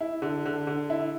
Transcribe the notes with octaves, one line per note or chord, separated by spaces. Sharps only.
E4
D3
D3
D3
E4